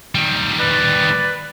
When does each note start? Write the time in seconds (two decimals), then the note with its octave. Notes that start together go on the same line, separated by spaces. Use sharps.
0.15 D#3 G3
0.59 B4 D5